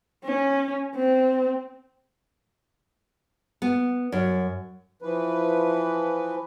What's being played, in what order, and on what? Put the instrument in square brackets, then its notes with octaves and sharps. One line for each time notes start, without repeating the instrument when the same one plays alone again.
[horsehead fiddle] C#4
C4
[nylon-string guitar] B3
F#2
[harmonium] E3 F3 B4